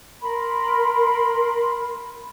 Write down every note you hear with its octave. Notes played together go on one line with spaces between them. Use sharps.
A#4 B5 C6